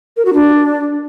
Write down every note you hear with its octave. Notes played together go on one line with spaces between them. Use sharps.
A#4
F#4
D4